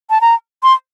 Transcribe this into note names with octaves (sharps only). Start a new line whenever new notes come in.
A5
A#5
C6